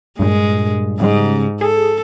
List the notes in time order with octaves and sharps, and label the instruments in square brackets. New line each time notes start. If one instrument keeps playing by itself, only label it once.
[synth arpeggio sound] G2 A#2 [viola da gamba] G#3
[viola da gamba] G#2 [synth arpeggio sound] C#3 G3 G#3
[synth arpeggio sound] G#4 [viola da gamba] A4